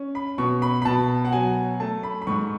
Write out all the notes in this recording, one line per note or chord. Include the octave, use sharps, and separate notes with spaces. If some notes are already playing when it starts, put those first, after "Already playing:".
Already playing: C#4
B5
B2 C#6
B5
B5
B2 A5
F#5
F#3 G#5
A3 A5
B5
B5
G#2 C#6